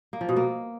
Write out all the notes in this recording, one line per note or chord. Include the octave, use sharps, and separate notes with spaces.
A#3
F3
B2
A#3